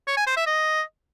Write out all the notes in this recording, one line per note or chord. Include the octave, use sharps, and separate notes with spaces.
C#5
G#5
C5
E5
D#5